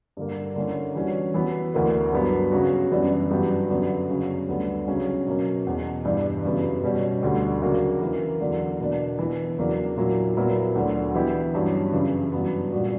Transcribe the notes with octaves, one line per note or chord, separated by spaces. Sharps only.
G2 D3 A#3
D3 A#3 C#4 E4
E3 G3 C#4 F#4
E3 B3 F#4
D2 D3 A#3 E4 A#4
G2 F#3 B3
C#3 F#3 C#4 F#4
F#2 E3 G3 B3 D4
G2 F#3 B3 D4 G4
F#2 D3 F#3 B3
F#2 C#3 F#3 C#4 F#4
D2 D3 G3 B3
C#2 C#3 F#3 C#4
B2 F#3 A#3 C#4
E2 B2 F#3
G2 E3 G3
F#2 C#3 F#3 B3
B2 G3 C#4
D2 D3 G3
C#3 F#3 A#3 D4 F#4
E3 A#3 E4 A#4
E2 D3 F#3 A#3 D4
B2 A#3 D4
E3 B3 E4
E2 C#3 F#3 A#3 D4
A#2 F#3 A#3 E4
A#2 F#3 B3 E4 A#4
D2 D3 F#3
E3 B3 E4 G4
G2 F#3 C#4
F#2 C#3 E3
G2 F#3 B3
A#2 G3 B3 F#4